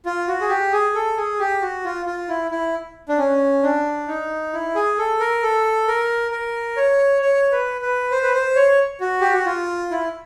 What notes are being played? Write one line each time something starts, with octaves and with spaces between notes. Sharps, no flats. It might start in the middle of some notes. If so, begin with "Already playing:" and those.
F4
F#4
G#4
G4
G#4
A4
G#4
G4
F#4
F4
F4
E4
E4
D4
C#4
D4
D#4
E4
G#4
A4
A#4
A4
A#4
A#4
C#5
C#5
B4
B4
C5
B4
C5
C#5
F#4
G4
F#4
F4
E4